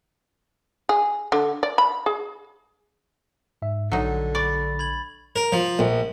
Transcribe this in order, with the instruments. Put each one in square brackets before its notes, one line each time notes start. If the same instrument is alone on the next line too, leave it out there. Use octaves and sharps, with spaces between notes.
[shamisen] G#4
D3
D5
B5
G#4
[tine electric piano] G#2 E5
[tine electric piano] A#1 [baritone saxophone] D3 [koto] F#3 D#4
[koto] D5 [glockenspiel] B5 C#6 A6
[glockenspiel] B5 G#6 F#7
[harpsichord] A#4
F3
A#1